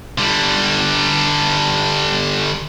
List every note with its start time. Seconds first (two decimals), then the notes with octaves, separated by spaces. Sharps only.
0.18 D3 G3